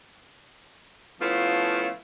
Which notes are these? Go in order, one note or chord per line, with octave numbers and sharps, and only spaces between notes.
F3 A3 B3 C#4 E4 F4